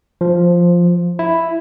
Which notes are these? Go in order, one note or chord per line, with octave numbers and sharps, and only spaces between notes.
F3
E4